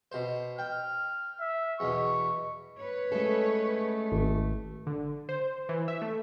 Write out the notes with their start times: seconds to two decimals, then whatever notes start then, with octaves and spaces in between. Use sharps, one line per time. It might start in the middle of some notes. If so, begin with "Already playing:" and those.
0.12 B2 C5
0.59 G5 F6
1.40 E5
1.80 E2 B2 C#6
2.78 B4 C#5
3.12 G#3 A3 C#4 A4
4.12 G#1
4.87 D3
5.29 C5
5.69 E3
5.88 E5
6.02 A3